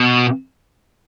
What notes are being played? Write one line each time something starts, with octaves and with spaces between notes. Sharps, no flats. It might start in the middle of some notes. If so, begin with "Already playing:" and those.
Already playing: B2